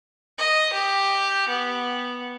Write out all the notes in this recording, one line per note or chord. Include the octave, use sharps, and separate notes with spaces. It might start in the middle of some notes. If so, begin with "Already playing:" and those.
D#5
G4
B3